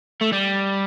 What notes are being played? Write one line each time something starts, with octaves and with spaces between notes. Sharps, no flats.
A3
G3